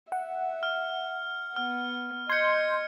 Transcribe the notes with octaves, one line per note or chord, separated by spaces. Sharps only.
E5 F#5
F6
B3 F6
D#5 C6 G6 G#6 C#7